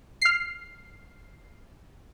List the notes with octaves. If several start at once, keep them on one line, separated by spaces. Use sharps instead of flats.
F6 C7